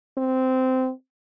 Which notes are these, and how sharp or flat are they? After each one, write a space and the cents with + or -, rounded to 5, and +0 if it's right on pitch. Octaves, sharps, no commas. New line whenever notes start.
C4 -15